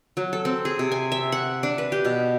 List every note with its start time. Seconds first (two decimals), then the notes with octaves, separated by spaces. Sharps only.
0.17 F#3
0.33 A4
0.45 C4
0.65 G#4
0.79 C3
0.92 G#5
1.12 E5
1.32 F#5
1.63 D4
1.78 B4
1.92 G4
2.05 B2